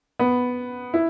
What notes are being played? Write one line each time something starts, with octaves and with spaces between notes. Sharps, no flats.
B3
E4